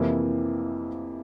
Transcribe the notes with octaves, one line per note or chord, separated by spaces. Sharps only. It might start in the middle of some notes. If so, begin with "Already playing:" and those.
Already playing: F2 C3 E3 A#3 E4